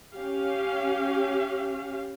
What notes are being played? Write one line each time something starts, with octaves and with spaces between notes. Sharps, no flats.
C#4 G4 F5